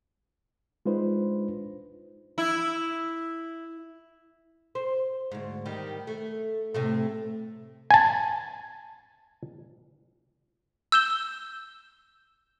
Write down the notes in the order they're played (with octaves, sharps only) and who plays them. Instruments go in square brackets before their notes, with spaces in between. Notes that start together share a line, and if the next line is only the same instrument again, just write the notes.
[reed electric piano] G#3 D4 D#4 F4 B4 C5
[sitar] E4
[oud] C5
D2 G#2
D#3 G3
A3
A2 C3 A3
[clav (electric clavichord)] G#5 A5
[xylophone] E6 G6 E7 G7